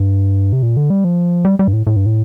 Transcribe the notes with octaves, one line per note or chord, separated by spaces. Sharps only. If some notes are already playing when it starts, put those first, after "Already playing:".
Already playing: G2
C3
A#2
D3
G3
F3
G3
G3
G2
A2
A2
G2
A2